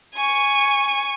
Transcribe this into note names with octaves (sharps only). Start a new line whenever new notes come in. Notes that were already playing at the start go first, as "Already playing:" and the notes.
G#5 C#6